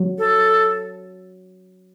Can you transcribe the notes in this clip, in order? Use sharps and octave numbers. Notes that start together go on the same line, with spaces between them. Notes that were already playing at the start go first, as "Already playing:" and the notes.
Already playing: F#3
A4